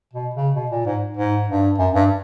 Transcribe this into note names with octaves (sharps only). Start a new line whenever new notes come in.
B2
C#3
B2
A#2
G#2
G#2
G2
F#2
G2